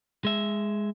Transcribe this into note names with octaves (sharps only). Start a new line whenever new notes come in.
G#3 E5